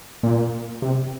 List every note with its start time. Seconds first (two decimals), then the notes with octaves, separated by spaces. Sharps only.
0.23 A#2
0.82 C3